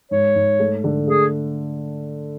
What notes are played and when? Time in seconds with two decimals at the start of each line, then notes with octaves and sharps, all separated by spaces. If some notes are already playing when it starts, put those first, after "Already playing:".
0.11 G#2 C#5
0.35 G#2
0.60 A3
0.84 D3
1.07 A3 G#4